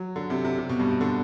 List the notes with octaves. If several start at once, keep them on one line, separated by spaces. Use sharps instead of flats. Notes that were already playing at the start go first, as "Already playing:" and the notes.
Already playing: F#3
D3
C3
C3
C3
B2
G2
B2
D3